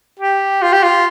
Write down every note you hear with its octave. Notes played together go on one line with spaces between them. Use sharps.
G4
F4
G4
F4